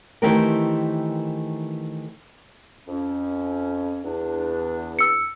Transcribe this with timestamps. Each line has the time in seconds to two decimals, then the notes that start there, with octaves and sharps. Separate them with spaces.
0.22 D#3 E3 A3 C4 G4 A#4
2.87 F2 C#4
4.04 E2 D4
4.99 E6 C#7